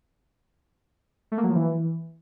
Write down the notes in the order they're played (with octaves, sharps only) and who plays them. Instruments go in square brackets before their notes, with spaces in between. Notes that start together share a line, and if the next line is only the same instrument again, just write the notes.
[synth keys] A3
A#3
F#3
F3
E3